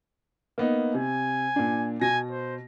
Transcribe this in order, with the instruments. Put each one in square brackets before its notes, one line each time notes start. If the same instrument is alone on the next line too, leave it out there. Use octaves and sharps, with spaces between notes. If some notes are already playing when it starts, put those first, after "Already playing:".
[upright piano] A#3 B3 D#4
[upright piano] C3 [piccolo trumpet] G#5
[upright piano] A#2 D4
[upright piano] B2 A#6 [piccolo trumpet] G#5
[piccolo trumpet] C5